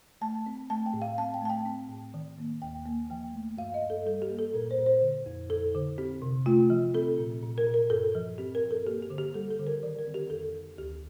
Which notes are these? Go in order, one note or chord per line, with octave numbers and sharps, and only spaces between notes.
A3 A5
C4
A3 A5
G5
A2
F5
C4 A5
G5
A3 A5
G5
C4
A2
D#3
A#3
D#2 G5
A#3
F3 G5
A3
G2 F5
D#5
G2
A4
G3 A4
G4
A#3
A4
A#2 A#4
C5
A#2
C5
D3
F2
F2 A4
D3
C4 G4
C3
A3 F4
F3
C4 A4
A#2
A#2
A#4
A#2
A#4
G2 A4
F3
C4 G4
A#4
G2
A4
A#3 G4
G4
D3
G4
G3 A4
A4
D3
A#4
D#3 D5
A#4
C4
G4
F2 A4
D#3
D2 G4